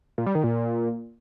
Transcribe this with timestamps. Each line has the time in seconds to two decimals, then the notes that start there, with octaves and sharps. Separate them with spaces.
0.18 A#2
0.26 G3
0.35 D#3
0.44 A#2